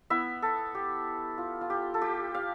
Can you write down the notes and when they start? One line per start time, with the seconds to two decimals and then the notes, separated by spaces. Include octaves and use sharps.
0.10 B3 E4 E5
0.42 A4
0.75 G4
1.38 F4
1.61 F4
1.70 G4
1.94 A4
2.02 G4
2.34 F5